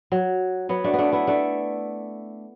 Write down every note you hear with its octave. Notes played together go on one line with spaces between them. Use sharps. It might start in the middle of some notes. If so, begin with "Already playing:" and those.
F#3
F#3 B3
A3 D4
B3
A3 D4
B3 E4
A3 D4